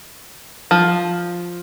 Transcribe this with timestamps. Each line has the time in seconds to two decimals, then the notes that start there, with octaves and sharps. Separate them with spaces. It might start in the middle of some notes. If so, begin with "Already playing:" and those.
0.71 F3